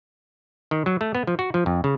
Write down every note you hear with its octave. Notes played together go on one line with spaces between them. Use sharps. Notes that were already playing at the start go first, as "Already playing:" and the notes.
D#3
F#3
A3
B3
F3
F#4
F3
F2
C#3